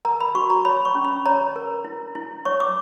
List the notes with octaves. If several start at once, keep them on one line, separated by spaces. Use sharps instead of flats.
A#4 A#5
B5
F#4 C#6
A#5
C#5 B5
C#6
C#4
B5
C#5 A#5
A#4
E4
E4
C#5 C#6
D6